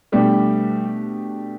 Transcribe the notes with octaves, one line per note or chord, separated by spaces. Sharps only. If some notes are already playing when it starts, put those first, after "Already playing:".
B2 G3 A3 D4 G4